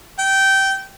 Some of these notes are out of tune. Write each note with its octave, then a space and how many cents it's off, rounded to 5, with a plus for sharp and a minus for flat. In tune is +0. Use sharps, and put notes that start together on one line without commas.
G5 -15